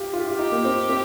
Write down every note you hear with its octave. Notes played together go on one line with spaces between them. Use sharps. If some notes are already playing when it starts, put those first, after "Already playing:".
Already playing: F4 G4
F4
G4
F4
D#4 G4
A#3
C4
C4